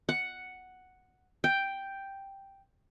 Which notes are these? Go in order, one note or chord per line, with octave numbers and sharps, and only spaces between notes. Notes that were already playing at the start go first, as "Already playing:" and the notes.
F#5
G5